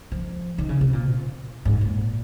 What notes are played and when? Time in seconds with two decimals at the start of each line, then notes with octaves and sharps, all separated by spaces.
0.12 F3
0.58 D#3
0.69 C#3
0.81 C3
0.93 A#2
1.65 G#2
1.81 A#2